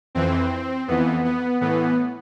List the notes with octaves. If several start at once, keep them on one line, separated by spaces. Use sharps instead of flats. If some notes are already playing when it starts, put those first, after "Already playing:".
F2 E3 C4
F2 E3 B3
B3
A2 E3 B3